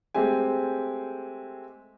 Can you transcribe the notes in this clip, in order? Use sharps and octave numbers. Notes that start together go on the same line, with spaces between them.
G#3 A3 C4 G4 G#5